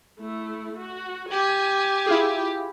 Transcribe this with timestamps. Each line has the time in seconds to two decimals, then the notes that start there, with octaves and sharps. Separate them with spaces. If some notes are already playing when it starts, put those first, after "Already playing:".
0.20 A3 E4
0.77 F#4
1.31 G4 G#5
2.06 E4 F4 G#4